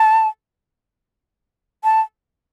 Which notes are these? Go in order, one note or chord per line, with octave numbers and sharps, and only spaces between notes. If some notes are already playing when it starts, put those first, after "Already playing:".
Already playing: A5
A5